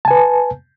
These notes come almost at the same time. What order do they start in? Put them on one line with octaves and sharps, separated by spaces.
A5 G#5 B4